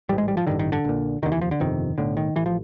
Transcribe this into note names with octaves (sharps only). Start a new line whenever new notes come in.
A1 G#2 G3
G#3
G3
F3
A1 G2 D3 D#3
D#3
D3
A#1 A#2
F1 D#2 D3 D#3
E3
F3
D3
G1 F2 C3 D#3
B1 A2 D3
D#3
A1 E3
F3